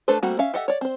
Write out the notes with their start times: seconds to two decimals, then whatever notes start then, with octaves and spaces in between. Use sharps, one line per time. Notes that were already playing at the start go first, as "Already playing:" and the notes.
0.08 A3 D4 A4 B4 C5
0.23 G3 A3 A#3 C4 F#4
0.39 C#4 E5 F5
0.54 G4 A4 D#5 E5 F#5
0.68 C#5 D5
0.81 C4 C5